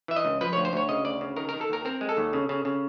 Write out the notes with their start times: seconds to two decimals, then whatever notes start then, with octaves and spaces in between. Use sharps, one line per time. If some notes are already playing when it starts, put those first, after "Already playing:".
0.08 E3 E5
0.16 D#5
0.25 C#2
0.41 F3 B4
0.53 D2 C#5
0.65 C5
0.73 D2 C#5
0.89 C#3 D#5
1.05 D2 D5
1.21 C#3
1.36 D#3 A#4
1.49 D#3 A#4
1.61 A4
1.69 D#2 A#4
1.85 C4 A#4
2.01 G#3
2.09 A4
2.17 D#2
2.33 C#3
2.49 C#3
2.65 C#3